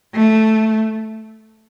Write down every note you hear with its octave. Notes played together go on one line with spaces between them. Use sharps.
A3